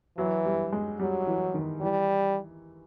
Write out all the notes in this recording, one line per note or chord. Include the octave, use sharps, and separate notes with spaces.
E3 F#3
G3
G#3
F#3 G3
E3
D#3
E3 G3